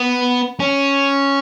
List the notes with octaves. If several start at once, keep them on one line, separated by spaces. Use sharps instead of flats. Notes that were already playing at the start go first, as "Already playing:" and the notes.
Already playing: B3
C#4